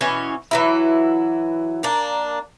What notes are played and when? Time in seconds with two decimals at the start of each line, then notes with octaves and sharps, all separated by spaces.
0.01 B2 E3 C#4 C#5
0.51 E3 F#3 E4
1.83 A#3 D4